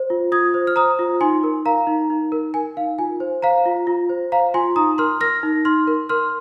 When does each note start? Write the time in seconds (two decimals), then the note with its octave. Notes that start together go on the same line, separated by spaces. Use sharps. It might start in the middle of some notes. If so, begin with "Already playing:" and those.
Already playing: C5
0.10 F4
0.32 F4 D#6 G#6
0.54 C5
0.67 F6
0.76 C5 A#5 D#6
0.99 F4
1.21 D#4 G#5 C6
1.43 A#4
1.65 A#4 F5 A#5
1.87 D#4
2.10 D#4
2.32 A#4
2.54 A#4 G#5
2.77 D#4 F5
2.99 F4 G#5
3.20 C5
3.42 C5 F5 A#5
3.66 F4
3.87 F4
4.09 C5
4.32 C5 F5 A#5
4.54 F4 G#5 C6
4.76 D#4 A#5 D#6
4.98 A#4 C6 F6
5.21 A#4 F6 A#6
5.43 D#4
5.65 D#4 C6 F6
5.87 A#4
6.09 A#4 C6 F6